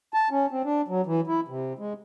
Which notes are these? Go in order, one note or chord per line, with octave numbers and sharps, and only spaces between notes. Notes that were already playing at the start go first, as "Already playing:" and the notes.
A5
C#4
C4
D4
F#3
E3
E4
C3
G#3